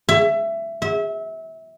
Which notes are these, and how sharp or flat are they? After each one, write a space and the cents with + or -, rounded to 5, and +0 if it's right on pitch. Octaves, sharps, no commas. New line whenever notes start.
E5 +20
E5 -25